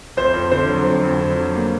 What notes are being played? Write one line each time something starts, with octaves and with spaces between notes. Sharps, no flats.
F2 C5
F2
D3 C5
F#3
F2
F2
D3
F#3
A#3